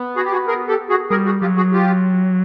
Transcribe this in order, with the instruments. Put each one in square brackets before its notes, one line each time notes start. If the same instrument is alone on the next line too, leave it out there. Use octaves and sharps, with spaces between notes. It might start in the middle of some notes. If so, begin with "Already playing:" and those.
Already playing: [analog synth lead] B3
[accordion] F#4 G#4
G4
F#4 G#4
G#4 A#4
G4 A4
F#4 G#4
[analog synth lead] G3 [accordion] G#4 A#4
[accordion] F#4 G#4
[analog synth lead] F#3 [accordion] F4 G4
[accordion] F#4 G#4
F4 G4